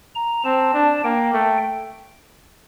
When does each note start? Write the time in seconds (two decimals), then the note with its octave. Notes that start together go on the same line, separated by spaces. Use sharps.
0.15 A#5
0.44 C4 A5
0.73 D4
1.04 A#3 G5
1.34 A3